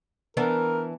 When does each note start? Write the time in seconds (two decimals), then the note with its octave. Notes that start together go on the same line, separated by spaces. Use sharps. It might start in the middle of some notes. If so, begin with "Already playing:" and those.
0.37 E3 B3 D4 A#4